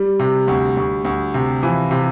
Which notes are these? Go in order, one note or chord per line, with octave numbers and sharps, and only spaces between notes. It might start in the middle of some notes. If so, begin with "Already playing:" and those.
Already playing: G3
C3
D2
D2
D2
C3
E3 F3
C3